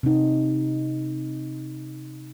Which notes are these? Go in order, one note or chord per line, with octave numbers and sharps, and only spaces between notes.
C3 D#4